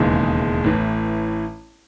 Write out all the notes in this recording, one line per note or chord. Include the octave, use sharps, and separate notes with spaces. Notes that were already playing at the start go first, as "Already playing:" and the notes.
Already playing: E1 D#2 C#3 E3 G#3
A1 A2 E3